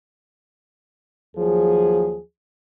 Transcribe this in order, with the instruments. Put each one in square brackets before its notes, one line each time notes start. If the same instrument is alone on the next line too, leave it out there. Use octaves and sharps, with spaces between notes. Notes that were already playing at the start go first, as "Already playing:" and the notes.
[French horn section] D#2 F3 F#3 G#4